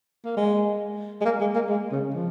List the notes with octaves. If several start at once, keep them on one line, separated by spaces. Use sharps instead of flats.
A#3
G#3
G#3
A#3
G#3
A#3
G#3
C#3
F3